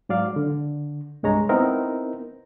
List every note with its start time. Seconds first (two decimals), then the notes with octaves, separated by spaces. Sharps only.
0.09 G#2 F#3 D5 F5
0.36 D3
1.23 C2 G2 G#3 C#5 A#5
1.49 B3 C4 D#4 E4 A#4